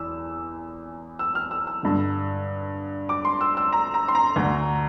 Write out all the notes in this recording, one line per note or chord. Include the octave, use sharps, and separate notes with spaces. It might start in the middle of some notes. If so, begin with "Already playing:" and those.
Already playing: E2 E3 E6
E6
F6
E6
E6
G2 D3
D6
C6
E6
E6
A#5
A#5
C6
A#5
D2 D3